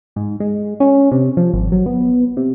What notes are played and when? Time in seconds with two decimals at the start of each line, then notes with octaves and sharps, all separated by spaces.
0.16 G#2
0.40 G#3
0.80 C#4
1.12 C3
1.37 F3
1.53 G#1
1.72 F#3
1.86 B3
2.37 C3